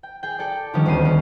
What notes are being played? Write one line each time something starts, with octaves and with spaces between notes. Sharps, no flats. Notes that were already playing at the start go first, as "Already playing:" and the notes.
G5
G#4 G5
A4 D5
D3 D#3 F3 G3 B3 C#4
D#1 D2 B3 C6 C7 D#7
C#4